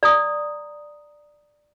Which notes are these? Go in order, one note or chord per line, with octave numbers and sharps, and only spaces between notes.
D5 A#5 D#6